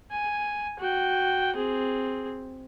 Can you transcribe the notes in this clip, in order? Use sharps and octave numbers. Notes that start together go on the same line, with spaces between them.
G#5
F#4 G5
C4 G#4